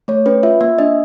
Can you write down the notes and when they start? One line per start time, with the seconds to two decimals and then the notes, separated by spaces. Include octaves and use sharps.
0.08 A3 C#5
0.26 C#4 B4
0.43 F4 E5
0.61 A#3 E5
0.78 D4 D#5